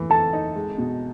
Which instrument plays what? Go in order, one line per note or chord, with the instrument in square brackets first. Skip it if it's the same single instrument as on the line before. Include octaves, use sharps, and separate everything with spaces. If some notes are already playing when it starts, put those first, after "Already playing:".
Already playing: [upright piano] E3 A3
[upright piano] A4 [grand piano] A5
[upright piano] D#4
G#3
B2